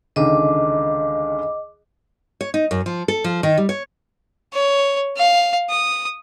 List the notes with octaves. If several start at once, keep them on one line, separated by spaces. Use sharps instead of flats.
C#2 D3 D#3 D#5 D6
C#5
D#4
F#2
F3
A4
F3
D#3
G3
C#5
C#5
F5
D#6